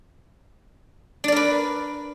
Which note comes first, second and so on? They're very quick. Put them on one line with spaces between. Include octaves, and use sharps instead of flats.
D4 D5 A#4 B4